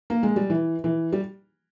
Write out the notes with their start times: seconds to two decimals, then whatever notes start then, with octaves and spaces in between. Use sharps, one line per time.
0.10 A#3
0.23 G#3
0.36 G3
0.50 E3
0.84 E3
1.13 G3